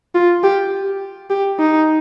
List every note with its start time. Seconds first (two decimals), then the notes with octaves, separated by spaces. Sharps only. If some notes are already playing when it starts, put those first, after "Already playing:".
0.15 F4
0.44 G4
1.30 G4
1.59 D#4